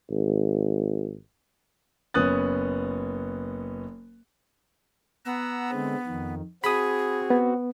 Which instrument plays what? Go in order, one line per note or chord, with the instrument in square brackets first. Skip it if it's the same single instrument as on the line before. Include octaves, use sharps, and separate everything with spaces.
[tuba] G#1
[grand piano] F#1 B3 C#4 D#6 F#6 A6
[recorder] B3 [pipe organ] F#5 A#5 E6
[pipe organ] D3 G#3 C4
F2 D#3
[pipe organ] C4 F#4 [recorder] G#4 [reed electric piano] B5 D#6
[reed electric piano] B3